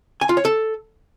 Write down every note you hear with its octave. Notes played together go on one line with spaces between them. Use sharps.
G#5
F4
C#5
A4